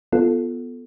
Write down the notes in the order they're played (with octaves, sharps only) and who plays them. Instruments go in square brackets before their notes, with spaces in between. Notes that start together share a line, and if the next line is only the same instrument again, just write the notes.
[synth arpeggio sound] B3 F4 A4